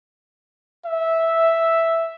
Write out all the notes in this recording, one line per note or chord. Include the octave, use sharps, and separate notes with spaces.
E5